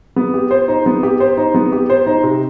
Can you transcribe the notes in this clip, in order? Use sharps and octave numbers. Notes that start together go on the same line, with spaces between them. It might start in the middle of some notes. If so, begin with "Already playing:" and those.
B3
G4
C5
D#4
B3
G4
C5
D#4
B3
G4
C5
D#4
C3